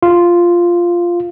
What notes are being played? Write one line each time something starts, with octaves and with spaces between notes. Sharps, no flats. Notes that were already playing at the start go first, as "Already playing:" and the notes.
F4